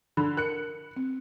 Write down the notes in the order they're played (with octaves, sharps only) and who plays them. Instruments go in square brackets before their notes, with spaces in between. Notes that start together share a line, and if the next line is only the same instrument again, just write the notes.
[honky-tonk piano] D3 [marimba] B5
[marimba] A#4 [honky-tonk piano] F#6 C#7
[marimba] C4